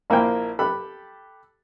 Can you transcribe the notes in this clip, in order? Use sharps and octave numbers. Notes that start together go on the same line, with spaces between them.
A#1 A#3 E4 C5 G5
G4 A4 B5 F#6